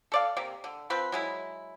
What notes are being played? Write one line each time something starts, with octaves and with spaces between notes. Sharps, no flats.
A4 D5 F5
C3 A#3
D3
F3 C4 B4
F#3 G#3 E4